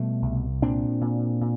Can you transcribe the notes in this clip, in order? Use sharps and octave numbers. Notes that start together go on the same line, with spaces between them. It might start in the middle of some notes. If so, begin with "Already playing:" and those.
Already playing: B2 G3 A3
C2
A#2 C4 D4
A#2
A#2